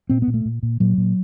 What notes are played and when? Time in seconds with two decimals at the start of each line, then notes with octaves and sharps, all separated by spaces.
0.09 A#2 C4
0.22 B3
0.27 A#2
0.34 A3
0.45 A#2
0.63 A#2
0.80 A#2 F#3
0.98 A#2